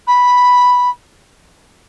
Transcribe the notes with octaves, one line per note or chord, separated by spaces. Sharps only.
B5